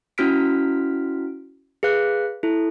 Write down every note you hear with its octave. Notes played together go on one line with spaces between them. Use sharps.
C#4 E4 F#4 F6 B6 D7
G#4 B4 F5 F#6
E4 A4